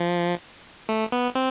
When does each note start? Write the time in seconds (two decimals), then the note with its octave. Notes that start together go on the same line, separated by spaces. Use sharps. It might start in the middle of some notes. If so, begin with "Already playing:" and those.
Already playing: F3
0.89 A3
1.12 B3
1.35 C4